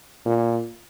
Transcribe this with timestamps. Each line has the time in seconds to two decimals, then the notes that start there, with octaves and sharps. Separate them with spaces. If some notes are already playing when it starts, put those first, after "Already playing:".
0.25 A#2